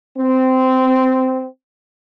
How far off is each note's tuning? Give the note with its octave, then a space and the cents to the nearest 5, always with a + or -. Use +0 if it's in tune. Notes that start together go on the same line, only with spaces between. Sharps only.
C4 -15